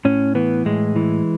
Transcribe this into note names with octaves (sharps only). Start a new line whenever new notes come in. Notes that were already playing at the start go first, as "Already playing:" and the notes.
A2 C#4
E3 B3
A2 G#3
E3